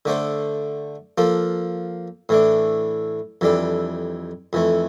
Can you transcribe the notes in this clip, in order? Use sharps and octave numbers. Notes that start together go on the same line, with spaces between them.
D3 A3 D4 A4 C5
F3 A#3 F4 A4
A2 E3 A3 D4
F2 E3 G3 D4 A4
F2 E3 A3